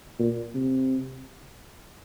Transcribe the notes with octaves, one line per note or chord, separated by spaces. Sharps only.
A#2
C3